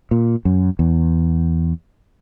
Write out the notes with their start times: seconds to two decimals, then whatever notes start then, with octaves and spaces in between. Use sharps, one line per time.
0.11 A#2
0.45 F#2
0.79 E2